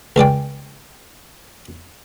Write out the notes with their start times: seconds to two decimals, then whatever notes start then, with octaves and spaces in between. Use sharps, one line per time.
0.16 C#2 G#3 D5 G5